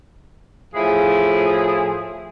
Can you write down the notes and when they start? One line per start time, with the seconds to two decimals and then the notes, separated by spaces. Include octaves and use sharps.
0.74 A2 F3 E4 G#4